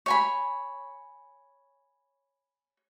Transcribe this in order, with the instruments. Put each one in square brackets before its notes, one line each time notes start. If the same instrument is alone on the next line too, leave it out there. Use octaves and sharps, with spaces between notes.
[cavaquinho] C#5 G#5 B5